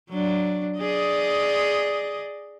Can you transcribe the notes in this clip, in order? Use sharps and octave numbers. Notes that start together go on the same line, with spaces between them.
F#3 D4
G#4 D5 D#5